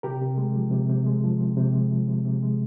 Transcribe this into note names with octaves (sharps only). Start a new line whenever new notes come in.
C3 G4 A#4
C3
G#3
F3
C3
C3
G#3
F3
C3
C3
G#3
F3
C3
C3
G#3